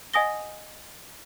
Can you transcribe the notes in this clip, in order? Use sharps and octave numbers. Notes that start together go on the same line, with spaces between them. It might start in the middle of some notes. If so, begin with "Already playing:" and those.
D#5 F#5 G#5 D#6 A#6 G7